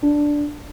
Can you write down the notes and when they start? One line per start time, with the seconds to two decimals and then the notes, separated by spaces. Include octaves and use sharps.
0.02 D4